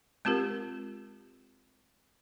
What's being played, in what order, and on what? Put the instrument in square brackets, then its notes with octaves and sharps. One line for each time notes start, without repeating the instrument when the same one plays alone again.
[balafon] G#3 C4 F4 G4 A#4